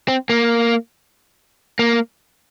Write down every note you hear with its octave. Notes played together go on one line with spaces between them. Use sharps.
C4
A#3
A#3